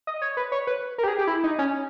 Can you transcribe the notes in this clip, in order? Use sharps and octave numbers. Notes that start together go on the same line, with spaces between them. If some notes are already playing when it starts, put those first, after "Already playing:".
D#5
C#5
B4
C#5
B4
A#4
G4
G#4
G4
E4
D#4
C#4